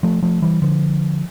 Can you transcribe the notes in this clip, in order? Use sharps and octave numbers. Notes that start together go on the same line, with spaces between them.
F3 A3
F3 A3
E3 G3
D3 F3